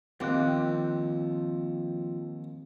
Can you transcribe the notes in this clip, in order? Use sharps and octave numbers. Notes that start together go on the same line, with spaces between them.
D#2 F3 C4 D6 F#6